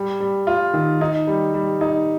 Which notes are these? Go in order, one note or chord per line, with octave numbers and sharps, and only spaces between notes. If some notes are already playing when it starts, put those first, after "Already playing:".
Already playing: G3
G3
F4
D#3
D#4
G3
G3
D#4